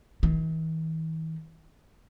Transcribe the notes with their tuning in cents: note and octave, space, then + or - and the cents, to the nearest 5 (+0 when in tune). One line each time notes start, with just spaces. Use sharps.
E3 -45